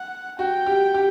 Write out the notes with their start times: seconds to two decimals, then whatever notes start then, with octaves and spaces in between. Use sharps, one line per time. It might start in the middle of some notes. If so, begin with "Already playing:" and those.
Already playing: F#5
0.39 F#4 G5
0.66 G4
0.94 G4